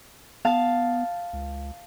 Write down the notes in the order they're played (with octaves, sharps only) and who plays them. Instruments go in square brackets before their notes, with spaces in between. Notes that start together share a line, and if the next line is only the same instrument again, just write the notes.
[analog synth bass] B3 [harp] F5 A5
[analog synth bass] C#2